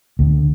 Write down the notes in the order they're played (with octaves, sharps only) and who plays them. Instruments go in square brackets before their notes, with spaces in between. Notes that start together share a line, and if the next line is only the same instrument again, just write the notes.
[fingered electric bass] D2